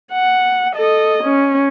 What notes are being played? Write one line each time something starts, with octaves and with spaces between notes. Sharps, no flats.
F#5
A4 D#5
C#4